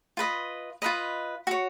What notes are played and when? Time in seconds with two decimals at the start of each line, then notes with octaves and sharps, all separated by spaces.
0.17 F4 B4 D#5
0.82 F4 B4 D#5 B5
1.47 F#4 C#5